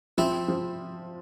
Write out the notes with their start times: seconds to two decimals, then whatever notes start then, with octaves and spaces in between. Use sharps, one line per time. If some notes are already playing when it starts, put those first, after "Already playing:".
0.18 F3 C4 E4
0.48 F3